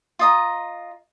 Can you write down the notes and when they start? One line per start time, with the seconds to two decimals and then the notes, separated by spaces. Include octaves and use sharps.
0.19 F4 D#5 A#5